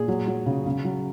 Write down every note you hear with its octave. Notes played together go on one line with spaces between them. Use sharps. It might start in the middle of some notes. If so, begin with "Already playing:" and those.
Already playing: A#2 G#4
F#3
F#3
C#3
C#3
F#3